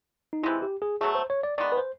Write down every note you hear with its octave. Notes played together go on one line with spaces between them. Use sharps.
D#4
C3 E3 G#3 E4
G4
G#4
B2 F#3 A3 G#4
C5
C#5
D5
D#3 G#3 B3 D5
B4
C5